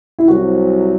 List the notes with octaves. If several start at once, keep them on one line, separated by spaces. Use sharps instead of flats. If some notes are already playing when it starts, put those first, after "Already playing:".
E4
C2 C3 F#3 F#4